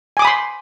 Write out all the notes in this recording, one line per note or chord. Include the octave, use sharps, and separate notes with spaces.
G#5 B5 C6 D6 D#6